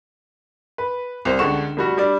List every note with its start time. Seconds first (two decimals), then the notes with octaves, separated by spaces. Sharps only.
0.78 B4
1.25 C2 C5
1.39 C#2 D3 A4 F#5 C#6 E7
1.77 F1 G3 F#4
1.97 G3 D4 D5